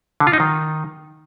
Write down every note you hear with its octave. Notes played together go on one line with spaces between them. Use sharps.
D3
F4
D#4
D#3